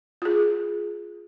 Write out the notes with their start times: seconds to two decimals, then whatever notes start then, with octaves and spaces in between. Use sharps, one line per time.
0.22 F4 G#4